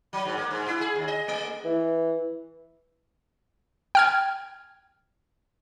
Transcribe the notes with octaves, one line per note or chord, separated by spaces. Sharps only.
F#3
G#2
A#3
G#2
E4
G#4
D#2
D#5
A3
E3
G5 F6 G#6